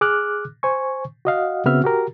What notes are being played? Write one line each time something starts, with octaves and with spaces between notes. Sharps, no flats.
G#4 D6 F6 F#6
C5 G#5 C#6
F#4 D#5 F5 F#5
C#3 B3 C4 F#4 E5 F6
F#4 G4 A#4